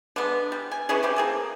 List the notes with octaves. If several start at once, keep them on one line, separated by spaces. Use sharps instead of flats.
D3 G#3 B3
G3
G#5
E3 A3 C#4 G#4
C4 E4 G4
A#3 G#4 A4